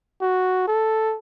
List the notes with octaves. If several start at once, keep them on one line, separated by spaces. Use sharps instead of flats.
F#4
A4